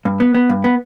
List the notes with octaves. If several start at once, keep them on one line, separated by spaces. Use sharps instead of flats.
G2
B3
B3
G2
B3